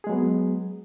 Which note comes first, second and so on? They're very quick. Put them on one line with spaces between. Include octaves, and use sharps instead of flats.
G#4 G#3 F#3 B3